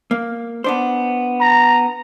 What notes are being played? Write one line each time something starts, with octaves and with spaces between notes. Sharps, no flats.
A#3
B3 D4 C5
A#5